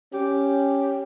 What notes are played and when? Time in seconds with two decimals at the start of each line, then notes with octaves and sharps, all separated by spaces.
0.14 C#4 G4